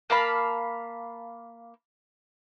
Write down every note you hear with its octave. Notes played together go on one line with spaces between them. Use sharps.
A#3 F5 A5 B5